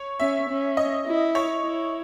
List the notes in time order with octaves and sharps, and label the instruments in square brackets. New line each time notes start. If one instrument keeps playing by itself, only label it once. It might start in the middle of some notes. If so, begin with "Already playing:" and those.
Already playing: [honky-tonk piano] C#5
[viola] C#4 [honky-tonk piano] E5
[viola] C#4
[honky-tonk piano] D#5
[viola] E4
[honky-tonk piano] C#5
[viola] E4